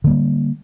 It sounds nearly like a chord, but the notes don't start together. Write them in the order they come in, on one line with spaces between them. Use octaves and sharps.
D3 A#3 G3